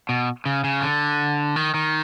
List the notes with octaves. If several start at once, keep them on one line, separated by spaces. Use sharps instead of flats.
B2
C#3
C#3
D3
D#3
D#3